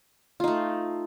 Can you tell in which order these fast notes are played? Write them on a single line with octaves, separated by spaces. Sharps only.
F4 D#4 A3